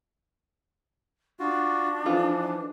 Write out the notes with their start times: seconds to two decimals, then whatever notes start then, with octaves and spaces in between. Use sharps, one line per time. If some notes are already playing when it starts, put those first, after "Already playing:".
1.40 D4 F4 F#4
2.06 E3 F3 D#4 F4 A4